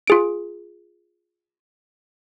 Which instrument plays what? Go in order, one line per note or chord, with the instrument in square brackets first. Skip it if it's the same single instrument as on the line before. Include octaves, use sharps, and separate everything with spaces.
[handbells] F4 G#4 D7